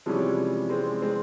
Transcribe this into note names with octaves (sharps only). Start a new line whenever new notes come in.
C3 E3 F3 G3 G#3 C#4
G#3 C4
G#3 C4